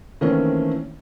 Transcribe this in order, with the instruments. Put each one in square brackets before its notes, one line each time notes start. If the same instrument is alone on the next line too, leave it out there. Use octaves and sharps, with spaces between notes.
[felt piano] D#3 E3 A3 A#3 C4 C#4